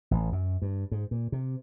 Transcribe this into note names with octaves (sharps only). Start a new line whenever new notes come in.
A1
F#2
G2
G#2
A#2
C3